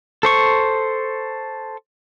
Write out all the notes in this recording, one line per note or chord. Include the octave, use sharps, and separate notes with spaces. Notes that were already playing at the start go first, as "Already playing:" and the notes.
A4 C5 C#6